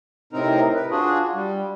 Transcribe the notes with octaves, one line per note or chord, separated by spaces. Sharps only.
A2 C3 C4 D#4 A#4 A#5
B4
D4 F4 F#4 G#4
G3